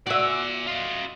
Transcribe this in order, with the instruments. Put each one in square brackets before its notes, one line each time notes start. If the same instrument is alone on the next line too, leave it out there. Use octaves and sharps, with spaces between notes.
[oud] F#4 E5 [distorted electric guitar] D5 G#5
[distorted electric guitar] F4 D#5